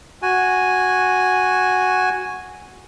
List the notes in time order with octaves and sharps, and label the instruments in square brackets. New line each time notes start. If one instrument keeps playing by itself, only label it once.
[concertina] F#4 G#5